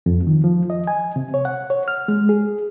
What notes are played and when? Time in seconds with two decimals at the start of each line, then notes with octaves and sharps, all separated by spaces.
0.06 F2
0.27 D#3
0.44 F3
0.70 D#5
0.87 G#5
1.16 C3
1.34 C#5
1.45 F#5
1.70 C#5
1.88 F6
2.08 G#3
2.29 G#4